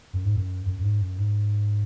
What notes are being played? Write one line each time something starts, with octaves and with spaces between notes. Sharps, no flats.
F#2
G#2
F#2
F#2
F#2
G#2
F#2
G#2